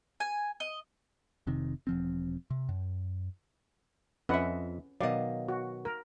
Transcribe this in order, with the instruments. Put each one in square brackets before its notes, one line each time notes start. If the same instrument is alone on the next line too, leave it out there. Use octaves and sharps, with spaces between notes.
[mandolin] G#5
D#5
[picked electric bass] F1 C3 D#3
E1 F3 C4
C3
F#2
[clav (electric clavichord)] F2 [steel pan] C#4 B4 F#5 [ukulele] D#5 E5
[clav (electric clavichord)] B2 D#3 F#3 [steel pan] D5 [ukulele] D#5 F5
[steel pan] F#4
A#4